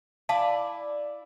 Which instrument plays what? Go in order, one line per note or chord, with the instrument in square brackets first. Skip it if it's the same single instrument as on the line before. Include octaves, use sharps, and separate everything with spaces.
[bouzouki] E4 D5 [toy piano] F5 A5